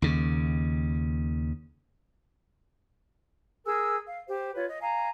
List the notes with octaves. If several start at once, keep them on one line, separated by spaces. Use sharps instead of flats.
D#2 C#3
G#4 A#4 G#5 E6
F5
G4 C5
F4 B4 C#5
D#5
F5 G#5 A#5